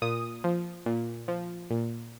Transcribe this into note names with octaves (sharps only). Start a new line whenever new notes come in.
A#2 D#6
F3
A#2
F3
A#2